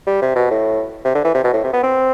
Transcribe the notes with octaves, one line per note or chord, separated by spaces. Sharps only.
G3
C3
B2
A2
C3
D3
E3
C3
B2
A2
C3
B3
C4